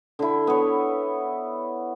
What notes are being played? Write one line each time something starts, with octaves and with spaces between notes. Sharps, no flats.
D3 E4
B3 C#5